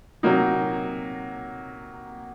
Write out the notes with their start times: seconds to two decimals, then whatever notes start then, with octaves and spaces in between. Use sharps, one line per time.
0.23 C3 F#3 A#3 D#4